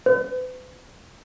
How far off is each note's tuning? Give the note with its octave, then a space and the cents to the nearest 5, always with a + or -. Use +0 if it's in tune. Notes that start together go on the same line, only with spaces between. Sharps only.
B4 +45